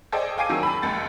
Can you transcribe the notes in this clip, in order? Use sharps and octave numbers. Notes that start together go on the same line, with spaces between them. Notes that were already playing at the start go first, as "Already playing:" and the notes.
G#4 A4 C5 D5 D#5 G5
F5 G5 G#5 D6 C7 D#7
D#3 F#3 G#4 E6
A5 B5
F1 C#2 A6